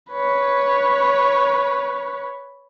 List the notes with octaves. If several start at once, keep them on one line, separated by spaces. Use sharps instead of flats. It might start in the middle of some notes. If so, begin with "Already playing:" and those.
B4 C#5